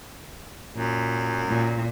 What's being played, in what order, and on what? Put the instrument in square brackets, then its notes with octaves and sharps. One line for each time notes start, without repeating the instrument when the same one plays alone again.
[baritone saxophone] F#2 [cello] A#2
[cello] A#2